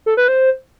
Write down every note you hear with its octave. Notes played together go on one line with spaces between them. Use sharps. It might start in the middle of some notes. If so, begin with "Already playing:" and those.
A4
B4
C5